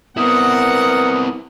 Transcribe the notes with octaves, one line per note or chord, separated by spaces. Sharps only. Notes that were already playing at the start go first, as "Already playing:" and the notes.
B3 C4 E4 A#4 F#5 D#6